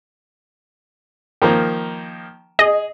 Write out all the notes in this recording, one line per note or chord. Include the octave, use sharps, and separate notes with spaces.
D#3 F3 A#3
G#4 D#5